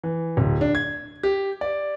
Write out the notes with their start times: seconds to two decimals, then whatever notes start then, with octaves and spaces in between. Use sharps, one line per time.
0.03 E3
0.37 D1
0.61 D4
0.75 G#6
1.23 G4
1.61 D5